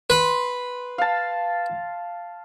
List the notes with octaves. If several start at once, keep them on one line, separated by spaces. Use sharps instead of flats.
B4 C6
F5 A5